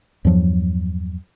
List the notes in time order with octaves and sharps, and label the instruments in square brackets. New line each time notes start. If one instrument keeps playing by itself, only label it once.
[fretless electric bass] E2 G2 F3 F#3